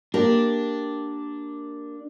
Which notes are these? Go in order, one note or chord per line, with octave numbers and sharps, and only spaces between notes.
A#3 D4 G4 A#4